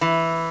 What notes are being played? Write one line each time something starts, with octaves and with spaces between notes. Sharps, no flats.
E3